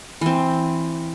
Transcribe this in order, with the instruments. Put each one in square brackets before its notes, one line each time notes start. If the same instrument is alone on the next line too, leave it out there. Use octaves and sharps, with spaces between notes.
[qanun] E3 C4